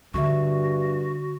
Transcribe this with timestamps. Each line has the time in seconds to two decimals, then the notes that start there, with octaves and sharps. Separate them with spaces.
0.14 G2 D3 A3 F#4 E5 C#6